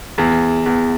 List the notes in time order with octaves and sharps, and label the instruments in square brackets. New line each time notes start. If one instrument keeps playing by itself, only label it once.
[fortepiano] E2
E2